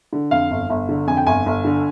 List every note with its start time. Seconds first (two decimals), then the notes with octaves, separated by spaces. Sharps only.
0.13 D3
0.31 F2 F5
0.51 G1
0.70 G1
0.89 D3
1.07 F2 G#5
1.17 G5
1.27 G1 G#5
1.46 G1
1.65 D3